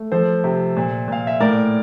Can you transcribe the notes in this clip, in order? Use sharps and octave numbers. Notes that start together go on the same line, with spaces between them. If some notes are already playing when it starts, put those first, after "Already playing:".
Already playing: A3
F3 A4 C5
C3
A#2
A#2 F5
E5
A2 A#4 D5